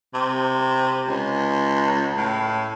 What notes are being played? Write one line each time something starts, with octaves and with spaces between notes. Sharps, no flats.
C3
C#2
A2